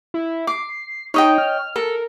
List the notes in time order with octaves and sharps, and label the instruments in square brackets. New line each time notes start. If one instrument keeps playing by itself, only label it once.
[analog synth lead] E4
[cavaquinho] D6 [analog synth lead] C7
[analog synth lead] D#4 [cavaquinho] C#5 D#5 G5
[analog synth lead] F6
[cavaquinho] A4 [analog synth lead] A#4